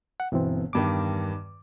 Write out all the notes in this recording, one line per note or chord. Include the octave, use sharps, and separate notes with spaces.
F#5
G1 B2 E3 C4
E2 G2 D#3 D6